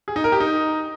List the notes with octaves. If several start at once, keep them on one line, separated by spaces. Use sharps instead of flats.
G#4
D#4
A#4
G4
D#4